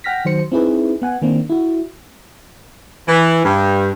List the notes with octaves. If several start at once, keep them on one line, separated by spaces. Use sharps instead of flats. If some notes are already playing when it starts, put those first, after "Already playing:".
F#5 G5 F6 A#6 B6
D#3 F#3 C5 C#7
C4 D#4 E4 G#4 B4
B3 F#5 G#5
D#3 A#3 C4 D4
E4 F#4
E3
G2